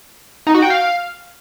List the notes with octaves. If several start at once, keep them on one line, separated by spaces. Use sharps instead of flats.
D#4
F#4
G5
F5